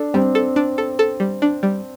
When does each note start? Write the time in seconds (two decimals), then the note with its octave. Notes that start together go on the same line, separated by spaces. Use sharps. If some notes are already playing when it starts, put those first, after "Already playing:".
Already playing: D4 A4
0.14 G3 C4
0.35 A4
0.56 D4
0.78 A4
0.99 A4
1.20 G3
1.42 D4
1.63 G3